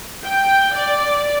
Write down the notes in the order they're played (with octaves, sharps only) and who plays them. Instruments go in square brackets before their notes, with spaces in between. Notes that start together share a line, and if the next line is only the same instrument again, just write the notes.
[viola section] G5
D5